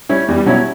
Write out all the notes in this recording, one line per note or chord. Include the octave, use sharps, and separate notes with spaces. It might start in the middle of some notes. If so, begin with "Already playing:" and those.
G3 C#4 E4
E2 G3
B2 F#3 C#4 E4